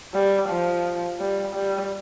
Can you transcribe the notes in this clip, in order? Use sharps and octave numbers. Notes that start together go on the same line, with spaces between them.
G3
F3
G3
G3